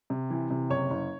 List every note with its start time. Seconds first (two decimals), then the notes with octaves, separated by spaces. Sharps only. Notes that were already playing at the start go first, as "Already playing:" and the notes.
0.10 C3
0.30 E3
0.50 C3
0.70 F#1 C#5
0.90 F#1